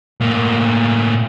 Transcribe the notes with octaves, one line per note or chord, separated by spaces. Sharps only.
A2 A#3